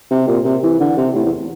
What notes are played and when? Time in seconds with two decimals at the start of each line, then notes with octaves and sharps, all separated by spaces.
0.11 C3
0.28 A#2
0.45 C3
0.63 E3
0.80 D3
0.97 C3
1.15 A2
1.25 E2